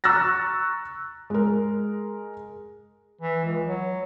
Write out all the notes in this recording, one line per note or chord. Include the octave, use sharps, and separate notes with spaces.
A#5 C#6 E6 F#6 A6 A#6
G#3 A#4
E3
C#2
F#3